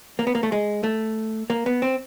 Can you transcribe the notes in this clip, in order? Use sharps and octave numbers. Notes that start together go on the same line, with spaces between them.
A#3
B3
A#3
A3
G#3
A3
A#3
B3
C4